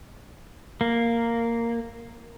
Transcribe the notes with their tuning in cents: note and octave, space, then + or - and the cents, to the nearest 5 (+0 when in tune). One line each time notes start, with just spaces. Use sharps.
A#3 -5